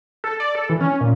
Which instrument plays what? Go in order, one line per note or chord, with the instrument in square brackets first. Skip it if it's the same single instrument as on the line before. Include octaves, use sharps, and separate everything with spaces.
[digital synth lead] A4
D5
A4
E3
C#4
A#2